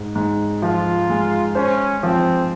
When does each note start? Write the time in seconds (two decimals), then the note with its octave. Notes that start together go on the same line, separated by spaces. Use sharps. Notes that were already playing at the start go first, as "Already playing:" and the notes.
Already playing: G#2
0.15 G#2
0.62 F3 F4
1.10 G#3
1.55 C#4 C5
2.03 F3 C4